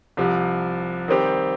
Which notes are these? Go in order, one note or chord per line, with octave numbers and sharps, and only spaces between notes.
C2 C3 F3
D#3 G3 C4 G4